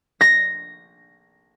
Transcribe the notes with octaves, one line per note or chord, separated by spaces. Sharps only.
A#6